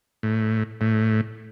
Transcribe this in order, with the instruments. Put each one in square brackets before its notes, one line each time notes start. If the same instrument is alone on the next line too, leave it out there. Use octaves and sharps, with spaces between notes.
[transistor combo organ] A2
A2